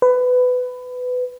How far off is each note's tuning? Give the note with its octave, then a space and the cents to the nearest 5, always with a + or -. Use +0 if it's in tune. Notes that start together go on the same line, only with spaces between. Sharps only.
B4 +20